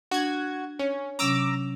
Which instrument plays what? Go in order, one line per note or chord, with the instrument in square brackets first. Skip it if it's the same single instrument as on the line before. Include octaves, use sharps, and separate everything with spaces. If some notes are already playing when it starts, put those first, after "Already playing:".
[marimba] D4 [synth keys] F#4 G#6
[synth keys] C#4 [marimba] C#5
[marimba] C3 F#3 C#4 [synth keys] A#5 D6 E6